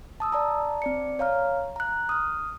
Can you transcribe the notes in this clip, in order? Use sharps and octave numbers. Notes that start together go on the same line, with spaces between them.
A5 D#6 E6
D5 A5 A#5
C4 D5 C#7
C#5 F5 A#5 F6
A#5 F#6
D#6 F6